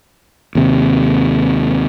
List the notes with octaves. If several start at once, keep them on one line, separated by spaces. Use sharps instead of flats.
D#2 C3